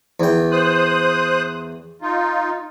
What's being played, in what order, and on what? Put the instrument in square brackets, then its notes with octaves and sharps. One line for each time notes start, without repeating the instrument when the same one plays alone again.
[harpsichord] E2 G5
[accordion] C5 D#6 F#6
D#4 F4